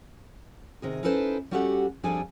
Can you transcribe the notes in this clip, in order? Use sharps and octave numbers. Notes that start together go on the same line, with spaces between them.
C3 D#3 G#4
C#4 D#4 E4 A4 B4 C5
G3 C#4 F#4 G4 A4 F#5
F2 G3 D4 G#4 A4 G#5